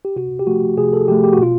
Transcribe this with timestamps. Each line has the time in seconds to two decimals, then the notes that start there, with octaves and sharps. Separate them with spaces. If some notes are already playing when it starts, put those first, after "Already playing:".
0.05 G4
0.16 C3 F#4
0.39 G4
0.47 F3 A3 F#4
0.77 C3 G#4
0.93 A4
1.08 F3 A3 G4
1.24 G4
1.33 F#4
1.39 B2 F4